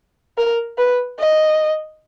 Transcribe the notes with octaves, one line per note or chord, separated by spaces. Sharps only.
A#4
B4
D#5